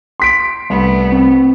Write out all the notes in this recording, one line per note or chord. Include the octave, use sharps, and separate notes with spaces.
C6 B6 D7
C2 A3 B3
C4